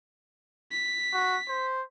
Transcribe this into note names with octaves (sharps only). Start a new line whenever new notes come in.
B6
F#4
C5